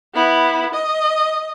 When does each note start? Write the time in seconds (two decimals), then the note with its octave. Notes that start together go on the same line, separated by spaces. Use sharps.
0.14 B3 E4
0.74 D#5